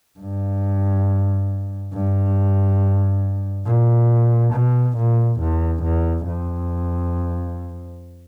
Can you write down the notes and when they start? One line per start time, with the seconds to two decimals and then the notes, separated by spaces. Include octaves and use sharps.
0.19 G2
1.93 G2
3.65 A#2
4.52 B2
4.96 A#2
5.39 E2
5.83 E2
6.26 F2